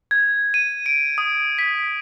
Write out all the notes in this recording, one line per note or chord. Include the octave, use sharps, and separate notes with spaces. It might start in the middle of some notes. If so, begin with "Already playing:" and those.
G#6
D#7
D7
D#6
B6